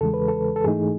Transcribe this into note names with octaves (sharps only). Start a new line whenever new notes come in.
E2 C#3 E3 G#3 A4
B4
A4
A4
G#2 E3 A3 D#4 G#4